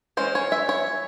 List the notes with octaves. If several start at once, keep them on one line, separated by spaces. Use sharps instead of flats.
E3 G#3 C#4 C5
C#5
E5
C#5